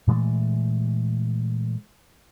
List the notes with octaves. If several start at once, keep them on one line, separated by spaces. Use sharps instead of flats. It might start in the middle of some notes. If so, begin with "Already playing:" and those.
A#2 E3 G#3 A3